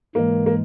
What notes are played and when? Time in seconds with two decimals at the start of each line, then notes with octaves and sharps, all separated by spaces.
0.15 G#2 E3 G#3 A#3
0.46 A#3